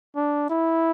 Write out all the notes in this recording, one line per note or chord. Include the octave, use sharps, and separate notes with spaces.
D4
E4